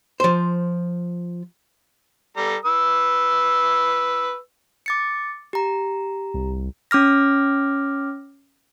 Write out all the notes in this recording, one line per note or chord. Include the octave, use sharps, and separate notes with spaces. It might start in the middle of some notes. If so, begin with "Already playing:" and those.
F3 C5
G3 A4 A#5
B4 E6
D6 A6 C#7
G4 A#5
C2
C#4 D6 F6 A#6